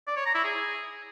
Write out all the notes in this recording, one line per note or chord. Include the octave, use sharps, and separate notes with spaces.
D5
C#5
A#5
E4
G#4